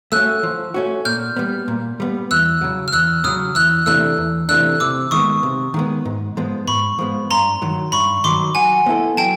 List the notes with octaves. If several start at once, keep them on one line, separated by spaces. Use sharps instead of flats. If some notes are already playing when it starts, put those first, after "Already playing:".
A3 C#4 F#4 E6 F#6
F3
A3 C#4 F#4
A#2 F6 G6
G3 B3
A#2
G3 B3
E2 E6 F#6
C#3 F#3
F6
E2 E6 F#6
C#3 F#3 D#6 F6
E2 E6 F#6
C3 E3 A3 D4 E6 F#6
E2
C3 E3 A3 D4 E6 F#6
C3 D6 E6
D#3 G#3 B3 C#6 D#6
C3
D#3 G#3 B3
G#2
F3 G#3 B3
G#2 B5 C#6
F3 G#3 B3
G2 A#5 C6
D#3 F#3
G2 B5 C#6
D#3 F#3 C6 D6
F#3 F#5 G#5
B3 E4 A4
F#3 G5 A5